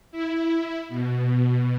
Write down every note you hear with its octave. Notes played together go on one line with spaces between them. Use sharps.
E4
B2